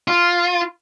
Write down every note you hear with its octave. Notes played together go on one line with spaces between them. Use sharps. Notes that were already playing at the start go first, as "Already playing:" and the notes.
F4